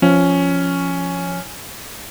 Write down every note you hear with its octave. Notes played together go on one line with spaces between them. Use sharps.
F3 C#4